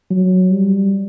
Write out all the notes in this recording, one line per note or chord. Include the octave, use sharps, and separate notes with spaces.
F#3
G3